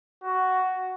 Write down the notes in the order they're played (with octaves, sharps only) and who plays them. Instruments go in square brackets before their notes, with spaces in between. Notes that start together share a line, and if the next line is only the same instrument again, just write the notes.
[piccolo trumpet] F#4